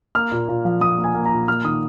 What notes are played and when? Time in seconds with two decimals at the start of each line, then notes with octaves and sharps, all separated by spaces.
0.15 A#3 F6
0.32 A#2
0.48 A#2
0.65 F3
0.81 F3 D#6
0.98 A#3
1.04 G#5
1.15 A#3
1.26 A#5
1.32 A#2
1.48 A#3 F6
1.64 D#3 D#6